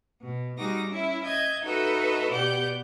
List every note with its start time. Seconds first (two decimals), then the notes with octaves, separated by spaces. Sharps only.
0.21 B2
0.58 G3 D#4 F#4 G#4 D6 A#6
0.87 C#4 E4 E5
1.24 D#5 E5 G6 G#6
1.63 D#4 F#4 A4 B4 D#5 E5
2.31 B2 B3 G4 D5 F#5 G6